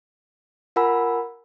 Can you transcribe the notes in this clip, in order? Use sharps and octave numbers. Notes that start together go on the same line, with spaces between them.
F4 A#4 F#5 G#5 B5 E6